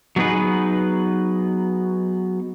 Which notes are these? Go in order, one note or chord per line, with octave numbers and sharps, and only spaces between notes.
F#3 A3 B3 D#4 G#4 B4